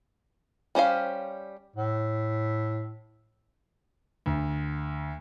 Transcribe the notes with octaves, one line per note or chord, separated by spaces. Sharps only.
G3 C#4 C5 F5
A2
D2